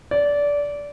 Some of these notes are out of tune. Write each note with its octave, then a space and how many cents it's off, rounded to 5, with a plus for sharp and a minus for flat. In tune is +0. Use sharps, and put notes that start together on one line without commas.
D5 -20